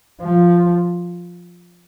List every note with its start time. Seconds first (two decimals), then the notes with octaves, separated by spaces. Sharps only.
0.21 F3